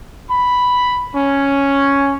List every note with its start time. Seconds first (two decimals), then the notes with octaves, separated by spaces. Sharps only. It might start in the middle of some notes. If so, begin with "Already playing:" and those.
0.30 B5
1.15 C#4